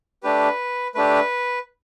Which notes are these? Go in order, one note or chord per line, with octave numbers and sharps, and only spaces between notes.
A3 D4 G4 B4
A3 D4 G4 B4